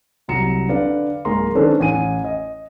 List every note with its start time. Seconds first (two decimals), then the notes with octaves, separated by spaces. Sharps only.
0.28 C2 F#3 A#5 C#7 E7
0.69 D3 B4 D5 F5
1.25 D1 G#3 A#3 A#5 C6
1.55 D#3 C#4 D4 A4 B4 C5
1.80 A1 G#5 D#7
2.24 D#5